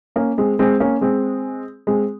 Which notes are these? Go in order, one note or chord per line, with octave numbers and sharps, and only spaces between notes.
A#3 C#4
G#3 C4
G#3 C4
A#3 C#4
G#3 C4
G#3 C4